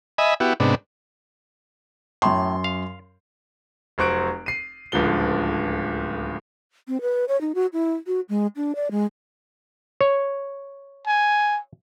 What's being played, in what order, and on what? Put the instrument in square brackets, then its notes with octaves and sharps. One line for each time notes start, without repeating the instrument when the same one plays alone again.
[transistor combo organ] D#5 E5 G#5 B5
B3 E4 F#4 G4
G#2 C3 B3 D4
[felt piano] F#2 C6 [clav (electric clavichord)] A2
[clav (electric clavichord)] F5
[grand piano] F1 F#3 C5 C#6 F#6 D7
C7 D#7
D1 C#2 D3 F3 G7
[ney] C4
B4
C#5
D#4
F#4
E4
F#4
G#3
D4
D5
G#3
[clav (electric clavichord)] C#5
[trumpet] G#5